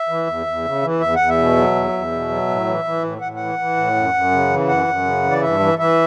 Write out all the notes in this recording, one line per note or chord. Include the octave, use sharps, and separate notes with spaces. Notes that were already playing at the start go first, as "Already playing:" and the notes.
Already playing: E5
E3
E2
E2
C#3
E3
E2 E5
E2 F#5
E5
B2
F#3
E2
E2
B2
F#3
A2
E3
E3
A2
A2 F#5
E3 F#5
E3
A2
F#2
F#2
C#3
E3
F#2 F#5
F#2
C#3
E3
D5
G2 E5
E3
E3 E5